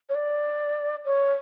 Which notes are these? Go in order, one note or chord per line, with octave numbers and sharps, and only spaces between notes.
C#5
D5
C#5